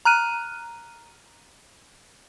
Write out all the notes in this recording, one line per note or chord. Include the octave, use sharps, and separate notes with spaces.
A#5 F6 F#6 D#7